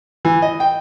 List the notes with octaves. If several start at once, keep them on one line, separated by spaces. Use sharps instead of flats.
E3
D#5
G5